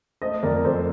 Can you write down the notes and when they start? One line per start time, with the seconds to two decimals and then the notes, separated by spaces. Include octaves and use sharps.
0.22 A3 C5 D#5
0.43 F2 A#4 D5
0.65 F2 A4 C5